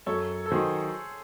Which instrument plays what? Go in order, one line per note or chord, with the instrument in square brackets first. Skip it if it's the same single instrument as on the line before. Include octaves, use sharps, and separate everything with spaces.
[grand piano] F#2 [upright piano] A4 C#5
[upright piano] A4
[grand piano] D#3 F#3 [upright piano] G#4 C5